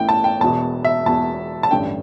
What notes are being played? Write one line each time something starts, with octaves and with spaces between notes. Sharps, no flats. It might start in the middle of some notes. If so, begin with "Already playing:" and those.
Already playing: A1 A2 E3 G5
A5
G5
E1 E2 B2 A5
E5
E1 E2 B2 A5
A5
A1 G2 D3 G5